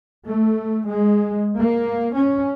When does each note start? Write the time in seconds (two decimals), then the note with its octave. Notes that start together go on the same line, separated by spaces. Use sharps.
0.26 A3
0.88 G#3
1.58 A#3
2.14 C#4